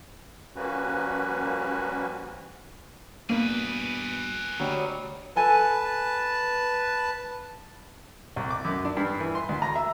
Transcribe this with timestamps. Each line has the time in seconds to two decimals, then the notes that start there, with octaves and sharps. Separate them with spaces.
0.56 F3 G3 A#3 C#4 F#4 B4
3.30 G2 B2 A#3 G#4 B4
4.60 D2 F#3 G3 D#5
5.36 A4 B4 G#5 A5
8.36 C2
8.51 D6
8.65 F#2
8.85 D4
8.97 G2
9.20 E3
9.35 C6
9.49 D2
9.62 A#5
9.76 E5